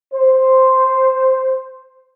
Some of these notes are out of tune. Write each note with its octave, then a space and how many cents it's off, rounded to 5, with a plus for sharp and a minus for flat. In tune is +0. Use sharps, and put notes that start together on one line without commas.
C5 +0